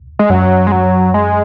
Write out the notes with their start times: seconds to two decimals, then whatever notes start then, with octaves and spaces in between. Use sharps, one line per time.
0.19 G#3
0.30 F#2 F#3
0.67 G#3
0.72 F#3
1.14 G#3